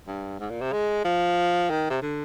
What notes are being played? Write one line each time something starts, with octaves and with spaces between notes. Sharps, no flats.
G2
G#2
A#2
C3
G#3
F3
D#3
C3
D3